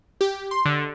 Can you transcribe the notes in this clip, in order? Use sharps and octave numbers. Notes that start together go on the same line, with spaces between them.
G4
C6
D3